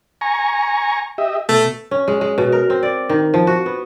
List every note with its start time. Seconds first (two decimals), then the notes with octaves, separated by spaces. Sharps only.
0.21 G#5 A#5 C#6
1.18 G4 D#5 E5
1.49 B2 A3
1.91 C#4
2.08 G#3
2.21 G#3
2.38 B2
2.52 A#4
2.70 C4
2.83 D5
3.09 D#3
3.34 F3
3.47 F#4
3.66 B3